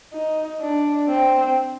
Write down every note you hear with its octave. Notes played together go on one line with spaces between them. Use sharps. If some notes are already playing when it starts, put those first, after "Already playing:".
D#4
D4
C4